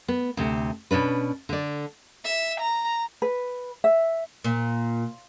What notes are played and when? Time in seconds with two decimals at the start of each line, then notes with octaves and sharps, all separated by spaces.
0.08 B3
0.37 D2 C3
0.91 B2 C#4 D4 B4
1.49 D3 D5
2.25 E5
2.60 A#5
3.22 B4
3.84 E5
4.44 A#2